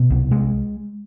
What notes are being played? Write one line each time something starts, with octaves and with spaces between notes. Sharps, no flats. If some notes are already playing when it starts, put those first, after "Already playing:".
Already playing: B2
C2
G#3